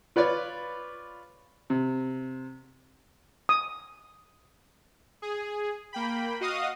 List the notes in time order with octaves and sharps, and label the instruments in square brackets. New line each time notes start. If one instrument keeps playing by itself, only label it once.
[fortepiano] F4 B4 C#5 D5
C3
[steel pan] D#6
[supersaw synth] G#4
A#3 G5 B5
F#4 D#5 F5 D#6